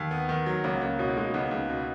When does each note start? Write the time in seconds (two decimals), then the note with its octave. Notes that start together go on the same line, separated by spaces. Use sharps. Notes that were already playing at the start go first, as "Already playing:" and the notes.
Already playing: D#2
0.11 B3
0.29 D#3
0.46 F#3
0.64 C#2 A#3 C#4
0.81 C#2 A#3 C#4
0.99 B2 C#4 E4
1.09 E4
1.17 G#3 D#4 F#4
1.34 C#2 B3 D#4
1.51 C#2
1.69 B2